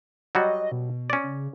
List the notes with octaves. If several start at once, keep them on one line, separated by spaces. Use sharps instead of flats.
F#3 G3 F#4 D#5
B2
C#4 D5
C#3